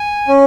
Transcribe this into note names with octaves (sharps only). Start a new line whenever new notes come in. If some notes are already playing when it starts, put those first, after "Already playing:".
Already playing: G#5
C#4